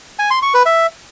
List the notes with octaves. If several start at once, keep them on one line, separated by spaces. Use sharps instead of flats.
G#5
C6
C#6
B4
E5